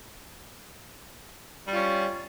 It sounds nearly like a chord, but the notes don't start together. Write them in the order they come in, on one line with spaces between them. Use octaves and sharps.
G3 F4 C#4